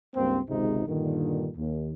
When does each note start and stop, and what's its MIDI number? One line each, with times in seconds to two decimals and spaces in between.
0.15 0.40 37
0.15 0.40 43
0.15 0.40 58
0.15 0.40 60
0.48 0.84 32
0.48 0.84 37
0.48 0.84 44
0.48 0.84 48
0.48 0.84 63
0.86 1.50 43
0.86 1.50 46
0.86 1.50 50
0.86 1.50 51
1.56 1.93 39